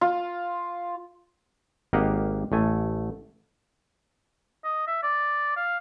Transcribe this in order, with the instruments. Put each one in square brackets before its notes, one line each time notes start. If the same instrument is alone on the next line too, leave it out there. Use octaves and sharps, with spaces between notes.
[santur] F4
[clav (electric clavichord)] G#1 A#3 G4 D#5 F5 F#5
A1 A3 G#5
[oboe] D#5
E5
D5
F5